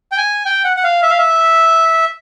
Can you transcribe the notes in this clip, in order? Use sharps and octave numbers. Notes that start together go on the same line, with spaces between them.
G5
G#5
G5
F#5
F#5
F5
E5
F5
E5